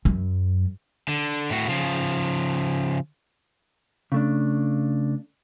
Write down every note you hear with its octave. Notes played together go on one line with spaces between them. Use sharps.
F#2
D3
A2 F#4
C#3 F3
C#3 A3 D4